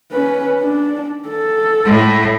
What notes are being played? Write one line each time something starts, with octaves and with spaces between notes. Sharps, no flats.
C#4 B4
D4
A4
A2